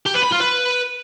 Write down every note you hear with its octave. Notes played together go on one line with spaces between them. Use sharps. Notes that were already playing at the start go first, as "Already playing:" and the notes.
G4
B4
B5
F4
B4